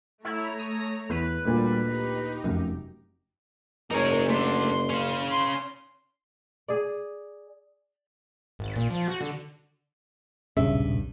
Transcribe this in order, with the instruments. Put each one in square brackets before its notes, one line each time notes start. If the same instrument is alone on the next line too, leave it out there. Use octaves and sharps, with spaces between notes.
[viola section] A3 C#5 A#5 [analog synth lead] E4
[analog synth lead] D#6
[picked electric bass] E2 [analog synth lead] B4
[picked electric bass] D2 A#2 [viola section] G3
[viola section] D#4 G4
[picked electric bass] F1 F#2
[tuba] F#1 [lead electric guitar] D#4 G#4 [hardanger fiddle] A#4 C#5
[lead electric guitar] A3 D4 [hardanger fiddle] C6
[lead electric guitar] C#4 F5
[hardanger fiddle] C6
[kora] G#4 D5
[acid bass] G#1
A#2
F3
F#4
D3
[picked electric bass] D#1 B1 G2 [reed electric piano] C#3 [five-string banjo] E5